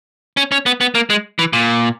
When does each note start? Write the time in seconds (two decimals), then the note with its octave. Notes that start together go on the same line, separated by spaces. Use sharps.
0.37 C#4
0.52 C#4
0.66 B3
0.81 B3
0.95 A#3
1.10 G#3
1.39 E3
1.53 A#2